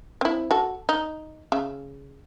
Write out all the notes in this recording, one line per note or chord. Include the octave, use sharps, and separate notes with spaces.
C4 E4
F#4 A4
D#4
C#3 E5